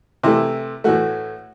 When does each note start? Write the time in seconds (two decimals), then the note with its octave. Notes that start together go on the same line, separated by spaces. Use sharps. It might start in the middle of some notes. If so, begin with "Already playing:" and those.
0.23 C3 E3 A3 E4
0.84 A2 E3 A3 F#4